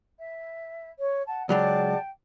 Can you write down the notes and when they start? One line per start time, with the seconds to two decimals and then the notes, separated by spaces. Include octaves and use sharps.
0.20 E5
0.99 C#5
1.27 F#5 A5
1.49 C#2 F#3 G#3 D5 F#5 G5 A5